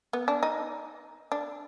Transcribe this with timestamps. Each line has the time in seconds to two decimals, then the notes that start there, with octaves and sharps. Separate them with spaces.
0.13 B3
0.28 D4
0.43 D#4
1.32 D4